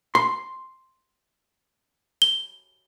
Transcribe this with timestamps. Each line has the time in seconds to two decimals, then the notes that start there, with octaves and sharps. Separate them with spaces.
0.15 C6
2.22 G7